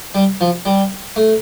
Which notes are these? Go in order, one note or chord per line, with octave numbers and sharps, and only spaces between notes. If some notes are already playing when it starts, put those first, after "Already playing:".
G3
F3
G3
A3